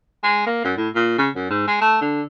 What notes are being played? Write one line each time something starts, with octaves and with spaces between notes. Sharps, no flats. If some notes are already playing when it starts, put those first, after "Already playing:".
G#3
A#3
F#2
A2
A#2
C#3
F#2
G#2
G#3
A3
D3